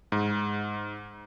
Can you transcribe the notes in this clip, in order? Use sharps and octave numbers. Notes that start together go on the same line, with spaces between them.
G#2